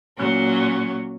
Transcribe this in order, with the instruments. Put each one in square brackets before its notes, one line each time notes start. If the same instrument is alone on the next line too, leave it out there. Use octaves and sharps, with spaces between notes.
[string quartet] A#2 F#3 C#4